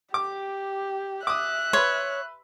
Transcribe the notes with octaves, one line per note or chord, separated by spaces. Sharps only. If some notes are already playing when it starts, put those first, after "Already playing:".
G4 D6
E5 D6 D#6 F#6
B4 C#5 C6